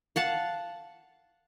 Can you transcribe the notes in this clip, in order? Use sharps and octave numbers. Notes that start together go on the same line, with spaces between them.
F5 F#5 A5